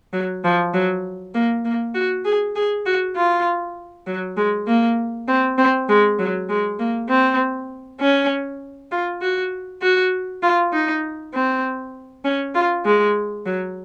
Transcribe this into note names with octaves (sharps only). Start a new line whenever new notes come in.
F#3
F3
F#3
A#3
A#3
F#4
G#4
G#4
F#4
F4
F#3
G#3
A#3
C4
C4
G#3
F#3
G#3
A#3
C4
C#4
F4
F#4
F#4
F4
D#4
C4
C#4
F4
G#3
F#3